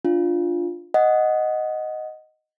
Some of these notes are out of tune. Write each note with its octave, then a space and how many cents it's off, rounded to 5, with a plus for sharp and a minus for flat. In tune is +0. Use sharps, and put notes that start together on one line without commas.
D4 +0 F4 +0
D#5 +0 F#5 +0